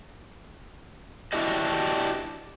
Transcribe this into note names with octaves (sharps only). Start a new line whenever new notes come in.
D4 E4 F#4 G4 D#5